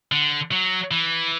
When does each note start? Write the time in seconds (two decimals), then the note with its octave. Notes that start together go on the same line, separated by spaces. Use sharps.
0.12 D3
0.52 F#3
0.91 E3